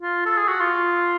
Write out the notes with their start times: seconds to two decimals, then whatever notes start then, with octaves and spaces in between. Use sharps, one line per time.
0.02 F4
0.26 A4
0.37 G#4
0.48 F#4
0.60 F4